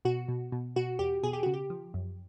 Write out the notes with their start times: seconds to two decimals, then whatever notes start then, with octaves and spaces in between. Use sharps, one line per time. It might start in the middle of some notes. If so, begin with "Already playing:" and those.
0.05 B2 F#4
0.28 B2
0.52 B2
0.76 B2 F#4
0.99 E2 G4
1.23 B2 G#4
1.33 G4
1.43 C#3 F#4
1.54 G4
1.70 F3
1.94 F#2